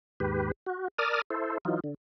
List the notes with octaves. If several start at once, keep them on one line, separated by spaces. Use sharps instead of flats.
D#2 G#2 G4 B4
F#4
A#4 D5 A5 D#6 F6
E4 A4 C5
E3 F#3 D#4 F4
D3